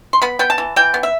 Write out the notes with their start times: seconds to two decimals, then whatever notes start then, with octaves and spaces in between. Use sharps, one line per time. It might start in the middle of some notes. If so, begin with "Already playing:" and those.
0.13 C6
0.22 B3 B5
0.39 B3 G5
0.50 A5
0.58 E3
0.76 E3 G5
0.94 B3
1.03 E5